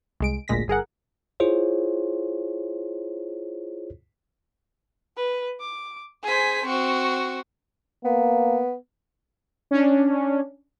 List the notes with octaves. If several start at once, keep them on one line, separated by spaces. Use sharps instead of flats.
C2 G#3 D7
G#1 D2 A#2 G#3 A#6 B6
G1 G#4 A#4 F#5
E4 F4 G#4 C5 C#5
B4
D6
G#4 C5 G#5 B6
C4 F#4 C#6
A#3 B3
C#4 D4